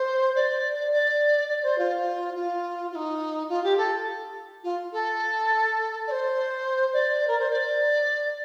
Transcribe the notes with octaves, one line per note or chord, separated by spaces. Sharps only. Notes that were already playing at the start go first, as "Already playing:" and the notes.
Already playing: C5
D5
D5
D5
C5
F4
F4
F4
D#4
F4
G4
A4
F4
A4
D5
C5
D5
A#4
C5
D5